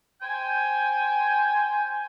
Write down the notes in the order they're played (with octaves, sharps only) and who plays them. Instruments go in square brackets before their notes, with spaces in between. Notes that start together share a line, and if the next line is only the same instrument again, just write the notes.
[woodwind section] C5 G5 G#5